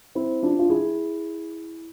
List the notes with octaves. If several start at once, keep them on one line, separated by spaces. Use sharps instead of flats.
C4 E4
D4 F4
F4
E4 G#4